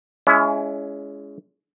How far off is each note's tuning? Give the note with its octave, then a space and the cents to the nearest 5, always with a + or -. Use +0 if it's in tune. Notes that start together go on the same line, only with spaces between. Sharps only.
G#3 +5 C#4 +30 E4 +25